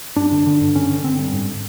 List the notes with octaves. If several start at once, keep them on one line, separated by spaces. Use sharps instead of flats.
G2 D4
D3
D3
G2
D3 C#4
D3
D3 C4
G2
G#2